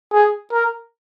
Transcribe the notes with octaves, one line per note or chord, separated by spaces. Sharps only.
G#4
A#4